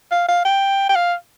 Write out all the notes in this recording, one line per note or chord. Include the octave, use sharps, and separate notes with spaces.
F5
F5
G5
G5
F5